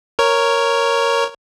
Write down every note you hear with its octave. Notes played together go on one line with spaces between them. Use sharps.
A#4 C#5